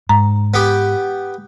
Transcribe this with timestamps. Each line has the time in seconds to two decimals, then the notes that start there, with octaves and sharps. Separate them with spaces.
0.09 G#2 A#5
0.54 B3 G4